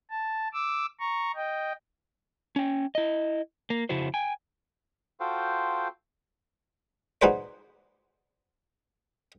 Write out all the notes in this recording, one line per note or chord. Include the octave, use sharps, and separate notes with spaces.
A5
D6 E6
A#5 C#6
D#5 G5
C#4 G5
E4 D#5
A#3
F2 C#3 E4 F#4 C5
G5 G#5
F4 F#4 A4 C5 F5 G5
D#4 F#4 G#4 B4 C5 D5